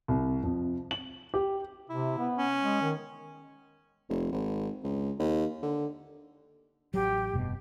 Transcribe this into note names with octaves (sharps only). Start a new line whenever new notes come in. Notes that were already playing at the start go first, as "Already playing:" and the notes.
C2
F2
F#7
G4
C3 E4
B3
C#4
G#3
D#3
F1
G#1
C#2
D#2
D3
A1 F#3 G4
F1 G2 B2